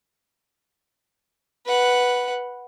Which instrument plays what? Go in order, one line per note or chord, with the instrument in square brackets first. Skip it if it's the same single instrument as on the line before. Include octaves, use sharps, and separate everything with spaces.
[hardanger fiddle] B4 F#5